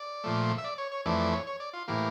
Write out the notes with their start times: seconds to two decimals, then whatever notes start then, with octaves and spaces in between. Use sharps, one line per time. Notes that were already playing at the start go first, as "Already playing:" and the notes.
Already playing: D5
0.24 A#2 F3 A3
0.58 E5
0.64 D5
0.78 C#5
0.92 C#5
1.06 F2 E3 A3 D5
1.19 D5
1.33 C#5
1.47 C#5
1.60 D5
1.73 F4
1.88 A2 E3 A#3 G4